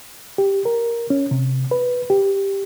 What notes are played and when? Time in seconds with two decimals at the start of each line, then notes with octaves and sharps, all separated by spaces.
0.38 G4
0.65 A#4
1.10 C#4
1.31 C3
1.71 B4
2.10 G4